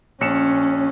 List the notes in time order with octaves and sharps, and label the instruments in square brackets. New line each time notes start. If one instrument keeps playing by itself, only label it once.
[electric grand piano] A#1 C#7 E7 [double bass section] C#4